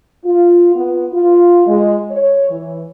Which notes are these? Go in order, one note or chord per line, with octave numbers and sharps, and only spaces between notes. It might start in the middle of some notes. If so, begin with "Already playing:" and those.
F4
B3
F4
G#3
C#5
E3